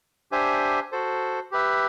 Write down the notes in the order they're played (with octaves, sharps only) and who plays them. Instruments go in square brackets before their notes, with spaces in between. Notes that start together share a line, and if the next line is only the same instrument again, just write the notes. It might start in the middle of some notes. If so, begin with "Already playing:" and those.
[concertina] D4 G4 C5 E5 G#5
F#4 A4 C5
G4 B4 E5